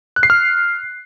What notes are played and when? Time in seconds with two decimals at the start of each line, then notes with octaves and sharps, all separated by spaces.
0.16 F#6
0.23 C7
0.30 F6